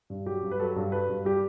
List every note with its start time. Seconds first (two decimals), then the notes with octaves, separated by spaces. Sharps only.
0.10 G2
0.26 F#3 G4
0.43 G2
0.51 B4
0.59 F#3 A4
0.76 G2
0.92 F#3 B4
1.09 G2
1.25 G3 G4